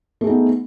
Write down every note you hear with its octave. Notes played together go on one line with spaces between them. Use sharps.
A3 B3 D#4 G#4